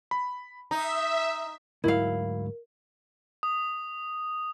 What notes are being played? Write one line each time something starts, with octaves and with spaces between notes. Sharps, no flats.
B5
D#4 E5 A#5
D2 G#2 F#3 E4 A#4 F5
D#6